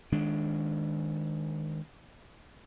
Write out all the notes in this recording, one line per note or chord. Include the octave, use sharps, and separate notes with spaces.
D#3 G#3 D4